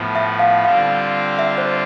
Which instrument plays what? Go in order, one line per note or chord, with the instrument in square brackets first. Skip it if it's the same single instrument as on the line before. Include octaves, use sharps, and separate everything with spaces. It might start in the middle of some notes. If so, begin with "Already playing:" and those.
Already playing: [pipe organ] A2 F3 B3
[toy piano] E5
F5
[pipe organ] D3 G3 C4 F4 [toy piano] F5
[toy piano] E5
C5